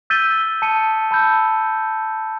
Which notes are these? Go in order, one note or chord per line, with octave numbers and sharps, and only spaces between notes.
E6 G6 A6 B6 D#7 G7
A5 D#6 C#7 D#7
A5 B5 E6 G6